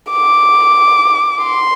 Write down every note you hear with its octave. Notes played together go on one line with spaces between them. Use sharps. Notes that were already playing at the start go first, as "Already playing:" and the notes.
D6
C6